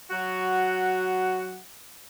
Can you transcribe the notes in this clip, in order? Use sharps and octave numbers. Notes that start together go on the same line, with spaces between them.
F#3 F#4 F#5